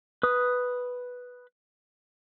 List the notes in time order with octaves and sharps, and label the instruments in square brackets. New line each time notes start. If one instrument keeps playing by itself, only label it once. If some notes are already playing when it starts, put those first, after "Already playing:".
[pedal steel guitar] B4 D#6